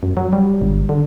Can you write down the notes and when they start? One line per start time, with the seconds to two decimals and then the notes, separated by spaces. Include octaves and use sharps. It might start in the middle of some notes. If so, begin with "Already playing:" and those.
0.03 F#2
0.17 F#3
0.33 G3
0.62 G1
0.89 D3